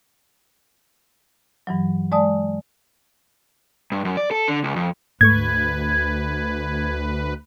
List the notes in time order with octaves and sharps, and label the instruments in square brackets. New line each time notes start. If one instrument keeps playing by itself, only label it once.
[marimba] G2 E3 F#3
G#3 D5 A5 D#6
[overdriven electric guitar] G2
F#2
D5
A4
D3
C#2
F2
[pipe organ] D2 B4 [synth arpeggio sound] G#2 A3 C#6 [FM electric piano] G#6